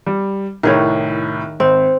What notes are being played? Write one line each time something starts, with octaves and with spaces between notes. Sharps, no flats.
G3
C2 A2 D#3 G#4 C#5
G#1 C4